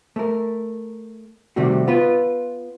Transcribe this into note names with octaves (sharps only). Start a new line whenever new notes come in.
A3 A#4
C3 D#3 G3 A3 F#4
B3 F4 B4